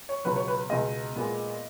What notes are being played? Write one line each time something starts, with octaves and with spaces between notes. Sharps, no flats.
C#5
C#2 B2 F#3 B4
C#5
B4
C#2 B2 G#3 D#5
A#2 G#3 B3